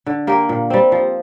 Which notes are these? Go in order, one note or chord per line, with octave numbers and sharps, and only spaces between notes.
D3
A#3 G4 A#4
A#2
G3 C4
F3